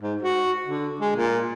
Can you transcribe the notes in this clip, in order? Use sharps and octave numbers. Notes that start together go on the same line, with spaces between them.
G#2
F#4
D3
G#3
A#2